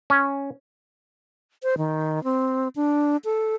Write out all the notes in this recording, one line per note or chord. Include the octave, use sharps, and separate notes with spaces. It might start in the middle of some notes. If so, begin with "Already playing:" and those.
C#4
C5
D#3
C4
D4
A4